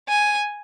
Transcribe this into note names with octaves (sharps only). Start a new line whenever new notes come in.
G#5